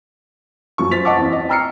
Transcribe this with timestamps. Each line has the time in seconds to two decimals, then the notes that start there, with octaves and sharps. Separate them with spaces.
0.78 F#2 F3 C#6
0.91 C5 A6 B6 F7
1.05 D#5 F#5 A5 C#6 D6
1.17 E2 C4
1.32 D#5
1.49 G5 A#5 E6 F6 C7 C#7